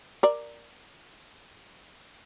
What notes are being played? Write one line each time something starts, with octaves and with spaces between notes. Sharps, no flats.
A#4 D5